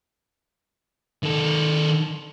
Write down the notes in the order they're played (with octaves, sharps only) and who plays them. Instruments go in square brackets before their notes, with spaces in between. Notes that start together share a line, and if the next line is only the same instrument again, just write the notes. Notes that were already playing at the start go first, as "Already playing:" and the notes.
[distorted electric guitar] D#3 A4